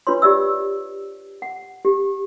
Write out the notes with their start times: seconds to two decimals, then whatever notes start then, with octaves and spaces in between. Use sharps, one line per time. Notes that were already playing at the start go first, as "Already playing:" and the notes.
0.07 D4 F4 B4 C#5 C6
0.22 F4 G4 D5 E5 E6
1.42 F#5
1.85 G4